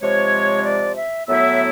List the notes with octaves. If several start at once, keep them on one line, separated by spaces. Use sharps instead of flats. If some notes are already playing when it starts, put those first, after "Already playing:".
C3 F3 G#3 C#5
D5
E5
A2 F#3 B3 E4 E5